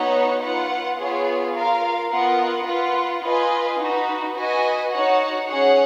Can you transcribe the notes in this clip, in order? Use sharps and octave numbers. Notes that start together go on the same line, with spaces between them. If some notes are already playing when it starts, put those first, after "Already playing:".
Already playing: B3 D#4 F#4 C#5 F#5
F4 B4 F#5
B3 F4 G#4 C#5
F4 A#4 F5
B3 F4 A#4 D#5 F#5
F4 B4 F#5
F4 B4 D#5 G#5
D#4 F#4 B4
F#4 B4 D#5 G#5
D#4 F#4 C#5 F#5
C#4 G#4 C#5 F#5